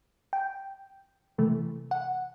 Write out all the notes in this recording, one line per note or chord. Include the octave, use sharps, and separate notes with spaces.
G5
C3 E3 A3
F#5